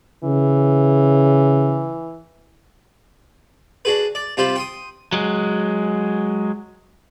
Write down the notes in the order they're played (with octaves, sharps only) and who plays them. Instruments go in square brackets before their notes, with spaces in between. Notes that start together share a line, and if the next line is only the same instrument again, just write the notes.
[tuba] C#3 [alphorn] E3
[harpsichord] D4 F#4 G#4 B4
D5
C3 G3 F4 G4 C5 B5
G5 C6 D#6
[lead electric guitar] F#3 G#3